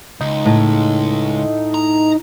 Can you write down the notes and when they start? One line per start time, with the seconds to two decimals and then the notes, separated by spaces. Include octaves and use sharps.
0.21 C#2 D#4
0.45 A2
1.74 A#5